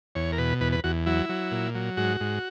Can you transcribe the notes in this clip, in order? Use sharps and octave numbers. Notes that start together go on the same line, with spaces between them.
E2 C#5
A#4
B2 B4
E2 B4
B4
E2 F#4
F#3 E4
F#3
A#2
F#3
G#2 F#4
G#2